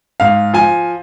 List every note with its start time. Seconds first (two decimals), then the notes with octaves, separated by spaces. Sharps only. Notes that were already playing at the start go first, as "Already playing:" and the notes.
0.20 G#2 F5
0.54 F3 G#5